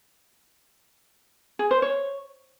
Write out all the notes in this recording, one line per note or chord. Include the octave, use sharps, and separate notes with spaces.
G#4
C5
C#5